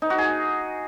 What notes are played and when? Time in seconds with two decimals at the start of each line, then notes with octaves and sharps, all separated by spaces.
0.02 D#4
0.10 F#4
0.18 G#4